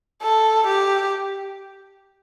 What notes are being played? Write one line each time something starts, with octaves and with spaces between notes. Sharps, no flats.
A4
G4